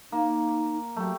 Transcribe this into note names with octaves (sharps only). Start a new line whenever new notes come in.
A#3 D#4
F#3 A3 G4